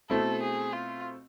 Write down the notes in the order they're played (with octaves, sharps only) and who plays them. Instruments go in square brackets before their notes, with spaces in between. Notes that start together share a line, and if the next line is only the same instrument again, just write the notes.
[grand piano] B2 A3 C4 E4 [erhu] A4
[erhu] G#4
F4